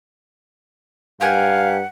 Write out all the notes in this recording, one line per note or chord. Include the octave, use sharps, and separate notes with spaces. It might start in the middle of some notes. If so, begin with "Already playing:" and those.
G2 G4 A#4 F5 F#5 G#5